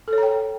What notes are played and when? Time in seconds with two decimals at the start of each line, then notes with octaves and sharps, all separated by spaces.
0.08 A4
0.13 C#5
0.18 A#5
0.23 G5